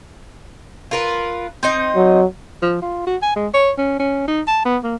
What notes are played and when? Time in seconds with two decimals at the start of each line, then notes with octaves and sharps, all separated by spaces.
0.91 F4 A#4 B4
1.63 C4 D#4 D#5
1.96 F#3
2.62 F3
2.82 F4
3.07 F#4
3.22 G#5
3.36 G#3
3.54 C#5
3.78 C#4
3.99 C#4
4.28 D#4
4.47 A5
4.65 B3
4.83 A#3